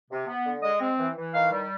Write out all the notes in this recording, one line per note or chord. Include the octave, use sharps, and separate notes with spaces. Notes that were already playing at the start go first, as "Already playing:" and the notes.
C3
B3
D3
G#3 D#5
C4
E3
E3
D#3 F5
G3